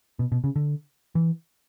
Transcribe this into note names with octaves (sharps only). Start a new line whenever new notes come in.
B2
B2
C#3
D3
E3